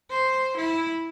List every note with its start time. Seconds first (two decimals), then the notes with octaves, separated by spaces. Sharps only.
0.10 C5
0.57 E4